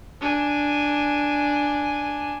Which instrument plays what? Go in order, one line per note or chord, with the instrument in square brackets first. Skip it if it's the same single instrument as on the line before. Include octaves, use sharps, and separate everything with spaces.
[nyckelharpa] D4 G#5